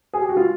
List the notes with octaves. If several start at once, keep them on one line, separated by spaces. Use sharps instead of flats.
G#4
G4
F#4
F4